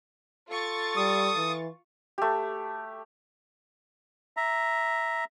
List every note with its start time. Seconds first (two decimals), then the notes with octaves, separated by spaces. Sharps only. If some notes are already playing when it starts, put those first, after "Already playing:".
0.50 F4 A4 C#6 A6
0.97 G3 D#6
1.37 E3
2.18 A3 G4
4.37 E5 A#5